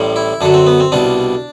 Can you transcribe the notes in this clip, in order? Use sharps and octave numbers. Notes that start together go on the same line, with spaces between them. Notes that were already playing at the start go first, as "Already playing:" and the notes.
Already playing: A1 A2 G3
E4
F#2 D3 F#3 D4
C4
B3
C4
C2 B2 G3 D4